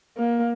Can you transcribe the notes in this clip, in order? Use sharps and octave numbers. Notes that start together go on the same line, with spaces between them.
A#3